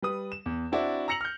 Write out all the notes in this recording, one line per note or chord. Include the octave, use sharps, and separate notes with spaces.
G3 B4 D#6
E7
E2
C4 D4 E4 F#4 D5
A#5 E6 A#6 C#7 F7 F#7
F6 G6